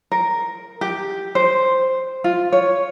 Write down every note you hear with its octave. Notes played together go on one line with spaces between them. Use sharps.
A#4
G4
C5
F4
C#5